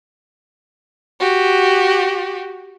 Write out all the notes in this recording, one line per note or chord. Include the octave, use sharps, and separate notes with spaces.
F#4 G4